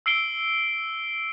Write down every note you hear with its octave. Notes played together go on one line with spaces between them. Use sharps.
E6 C7 D7 G7